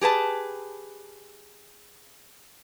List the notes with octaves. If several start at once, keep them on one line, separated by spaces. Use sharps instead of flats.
G4 G#4 B4 A5